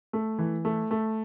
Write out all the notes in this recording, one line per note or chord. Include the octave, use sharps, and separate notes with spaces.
A3
E3
A3
A3